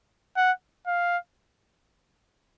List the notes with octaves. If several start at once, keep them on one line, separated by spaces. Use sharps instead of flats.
F#5
F5